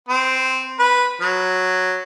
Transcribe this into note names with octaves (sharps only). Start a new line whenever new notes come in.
C4
B4
F#3